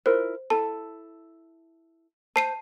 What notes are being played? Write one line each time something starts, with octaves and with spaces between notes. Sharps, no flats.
E4 F4 A#4 C5
E4 A4 A5
C5 A5 C7 D#7